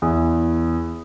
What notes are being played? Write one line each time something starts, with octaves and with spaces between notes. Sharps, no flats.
E2